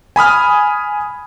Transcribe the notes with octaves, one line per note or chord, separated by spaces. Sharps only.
G#5 B5 D#6 F6